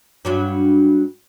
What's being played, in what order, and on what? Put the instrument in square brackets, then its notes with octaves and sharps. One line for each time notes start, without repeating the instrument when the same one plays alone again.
[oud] G2 F#3 D4